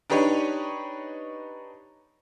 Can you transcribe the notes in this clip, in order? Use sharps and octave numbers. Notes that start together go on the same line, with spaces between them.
D4 D#4 G4 B4 C#5